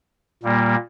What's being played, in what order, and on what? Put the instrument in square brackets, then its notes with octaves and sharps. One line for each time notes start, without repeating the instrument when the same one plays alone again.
[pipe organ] A#2 G3 A#3